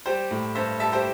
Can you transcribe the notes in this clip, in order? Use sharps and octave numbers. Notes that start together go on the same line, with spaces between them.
G3 G4 C5
A2
G2 C5 E5
G3 E5 A5
G4 C5